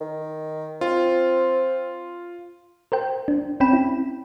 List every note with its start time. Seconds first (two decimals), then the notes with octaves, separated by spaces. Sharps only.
0.01 D#3
0.81 C4 F4
2.92 A#4 C5 G5
3.28 D4
3.60 C4 C#4 G5 B5 E7
3.73 E4